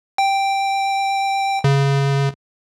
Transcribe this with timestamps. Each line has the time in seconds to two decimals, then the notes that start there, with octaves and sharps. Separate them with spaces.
0.18 G5
1.64 C#3